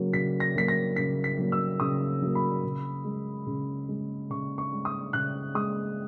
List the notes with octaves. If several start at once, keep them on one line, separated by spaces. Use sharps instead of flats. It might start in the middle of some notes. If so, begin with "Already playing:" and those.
Already playing: C#3 F#3 A#3
C#3 B6
A#6
F#3 A#3 B6
A#6
C#3 B6
B6
F#3 A#3
E6
C#3 D#6
F#3 A#3
B5
C#3
G#3
C#3
G#3
C#3 C#6
C#6
G#3
D#6
C#3 F#6
G#3 D#6